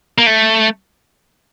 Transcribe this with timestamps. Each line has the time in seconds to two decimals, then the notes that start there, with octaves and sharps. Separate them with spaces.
0.18 A#3
0.26 A3